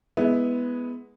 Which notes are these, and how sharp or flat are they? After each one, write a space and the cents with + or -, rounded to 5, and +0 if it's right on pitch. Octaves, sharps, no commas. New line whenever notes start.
G#3 +0 B3 +0 E4 -20